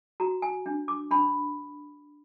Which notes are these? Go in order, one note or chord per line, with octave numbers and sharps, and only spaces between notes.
F#4 A#5
G#5
D4
D6
D4 B5